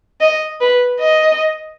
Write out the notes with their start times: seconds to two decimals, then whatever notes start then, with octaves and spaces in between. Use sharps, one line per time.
0.21 D#5
0.61 B4
1.00 D#5